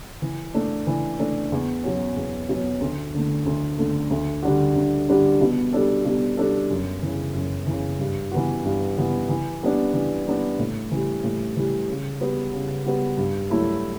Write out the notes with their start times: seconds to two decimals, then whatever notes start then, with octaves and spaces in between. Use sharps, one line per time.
0.22 E3
0.54 A3 D4
0.87 E3
1.19 A3 D4
1.52 E2
1.84 B2 F#3 C#4
2.16 E2
2.49 B2 F#3 C#4
2.81 D2
3.14 D3 A3
3.46 D2
3.78 D3 A3
4.11 D2
4.43 D3 G3 D4 F#4
4.76 D2
5.08 D3 G3 D4 F#4
5.41 B2
5.73 G3 D4 A4
6.05 B2
6.37 G3 D4 A4
6.70 F#2
7.02 C#3 E3
7.34 F#2
7.67 C#3 E3
7.99 G2
8.32 E3 B3 F#4
8.64 G2
8.97 E3 B3 F#4
9.29 E3
9.62 G3 B3 D4
9.93 E3
10.26 G3 B3 D4
10.59 A2
10.91 E3 G3
11.24 A2
11.57 E3 G3
11.88 C#3
12.21 G3 B3 F#4 B4
12.53 C#3
12.85 G3 B3 F#4 B4
13.17 G2
13.50 F#3 A3 E4 A4